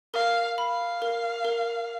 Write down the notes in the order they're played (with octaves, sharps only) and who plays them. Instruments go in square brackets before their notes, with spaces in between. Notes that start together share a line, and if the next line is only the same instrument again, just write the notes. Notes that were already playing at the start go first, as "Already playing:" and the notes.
[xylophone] A#4 [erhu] F5
[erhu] F5 [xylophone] B5
[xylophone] A#4
A#4